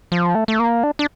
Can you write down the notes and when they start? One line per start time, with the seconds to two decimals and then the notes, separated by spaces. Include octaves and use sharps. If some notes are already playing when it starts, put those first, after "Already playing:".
0.12 F3
0.35 A3
0.48 A3
0.59 A#3
0.83 D4
0.99 D4